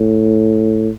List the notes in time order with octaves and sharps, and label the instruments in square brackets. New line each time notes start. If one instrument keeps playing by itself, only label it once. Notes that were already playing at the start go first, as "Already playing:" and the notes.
Already playing: [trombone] A2